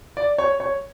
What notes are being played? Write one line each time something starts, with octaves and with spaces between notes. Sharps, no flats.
D5
C#5
C#5